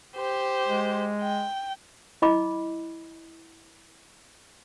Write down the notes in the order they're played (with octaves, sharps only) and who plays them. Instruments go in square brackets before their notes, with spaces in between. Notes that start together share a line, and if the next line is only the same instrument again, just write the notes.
[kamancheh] G4 C5
[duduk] G#3
[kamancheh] G5
[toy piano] E4 D#5 B5 D6